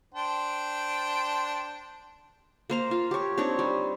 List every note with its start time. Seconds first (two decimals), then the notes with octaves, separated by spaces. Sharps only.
0.14 D4 C5 G5
2.70 A#3 C5 A#5
2.91 F4
3.11 G4 C#5
3.38 C4 D4 D#4 C#5
3.59 G3